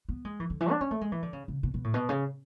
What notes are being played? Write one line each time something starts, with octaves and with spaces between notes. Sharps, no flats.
B3
G#3
E3
D3
E3
D4
C#4
A3
G#3
E3
D3
C#3
C#3
B2
B2
A2
B2
C#3